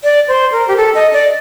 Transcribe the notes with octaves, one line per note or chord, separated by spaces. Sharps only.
D5
C5
A#4
G4
A4
D#5
D5